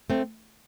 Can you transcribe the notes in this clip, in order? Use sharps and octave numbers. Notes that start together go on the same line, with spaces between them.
A3 C4